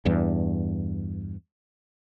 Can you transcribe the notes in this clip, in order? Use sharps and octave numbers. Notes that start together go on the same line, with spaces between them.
E2 G2